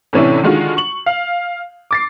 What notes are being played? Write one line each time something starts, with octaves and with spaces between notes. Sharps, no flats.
A2 C3 E3 C#4 D4 E4
D3 D#3 G#3 F4 F#4
C#6 F#7
F5
D6 A6 C7